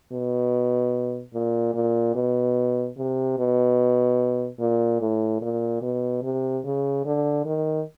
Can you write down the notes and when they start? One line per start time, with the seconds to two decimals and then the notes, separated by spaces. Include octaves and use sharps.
0.13 B2
1.34 A#2
1.75 A#2
2.16 B2
2.98 C3
3.38 B2
4.60 A#2
5.02 A2
5.42 A#2
5.82 B2
6.23 C3
6.65 C#3
7.06 D3
7.46 D#3